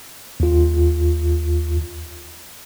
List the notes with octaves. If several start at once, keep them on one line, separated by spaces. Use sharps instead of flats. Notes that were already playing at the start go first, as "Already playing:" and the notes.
D#2 F4